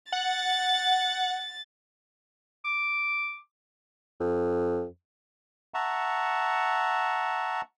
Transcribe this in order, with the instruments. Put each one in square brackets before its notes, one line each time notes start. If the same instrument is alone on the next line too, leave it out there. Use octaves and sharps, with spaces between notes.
[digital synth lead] F#5 [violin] A6
[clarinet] D6
[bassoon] F2
[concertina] E5 F#5 A5 A#5 C#6